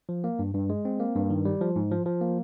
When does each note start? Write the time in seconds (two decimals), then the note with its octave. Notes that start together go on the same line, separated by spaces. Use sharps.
0.09 F3
0.24 A#3
0.39 G2
0.54 G2
0.70 G#3
0.85 C4
1.00 A#3
1.15 G2
1.30 D#3
1.45 G3
1.61 F3
1.76 G#2
1.91 F3
2.06 F3
2.21 A#3